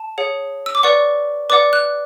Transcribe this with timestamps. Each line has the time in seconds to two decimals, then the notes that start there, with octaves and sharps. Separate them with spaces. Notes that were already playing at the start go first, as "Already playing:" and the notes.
Already playing: A5
0.18 G#4 C#5 F#5
0.66 E6
0.75 D6
0.83 B4 D5 F#5 C#6
1.50 B4 D5 F#5 D6
1.73 F#6